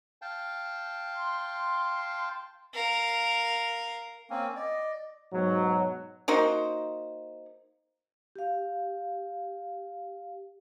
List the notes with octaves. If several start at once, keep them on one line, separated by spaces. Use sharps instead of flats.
F5 G5 A5
C6
A#4 F5
A#3 C4 C#4
D5 D#5
G#2 B2 F#3
A#3 D#4 F#4 C5
G4 F5